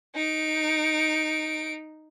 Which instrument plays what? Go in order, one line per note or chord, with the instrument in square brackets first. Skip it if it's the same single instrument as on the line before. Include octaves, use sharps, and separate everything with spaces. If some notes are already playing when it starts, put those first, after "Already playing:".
[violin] D#4 D7